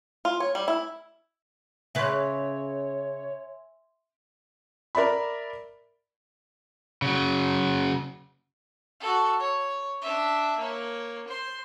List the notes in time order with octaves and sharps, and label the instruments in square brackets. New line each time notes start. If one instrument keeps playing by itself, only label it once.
[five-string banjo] F4
C#5
G3
E4
[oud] C#3 B4 [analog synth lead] C#5 [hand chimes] E5 G#5 C6
[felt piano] A#4 D5 E5 B5
[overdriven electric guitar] C#3 F#3
[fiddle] F#4 A4
C#5
D4 E5
A#3 C#5
C5 C6